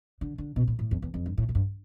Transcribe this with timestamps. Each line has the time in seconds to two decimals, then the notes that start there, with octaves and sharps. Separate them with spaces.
0.21 D3
0.38 D3
0.56 B2
0.67 A2
0.79 A2
0.91 F2
1.02 E2
1.14 F2
1.26 G2
1.38 A2
1.49 A2
1.55 G2